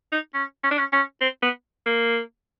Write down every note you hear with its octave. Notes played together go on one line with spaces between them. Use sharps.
D#4
C#4
C#4
D4
C#4
C#4
C4
B3
A#3